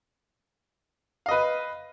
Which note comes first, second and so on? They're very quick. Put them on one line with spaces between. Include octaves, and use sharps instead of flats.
F5 D#5 B4